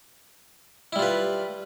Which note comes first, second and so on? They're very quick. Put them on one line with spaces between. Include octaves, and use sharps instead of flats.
E4 G3 F4 B4